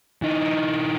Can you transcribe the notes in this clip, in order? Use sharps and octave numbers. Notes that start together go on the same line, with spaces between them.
E3 D#4